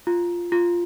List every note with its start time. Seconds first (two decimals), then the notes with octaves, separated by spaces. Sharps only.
0.07 F4
0.52 F4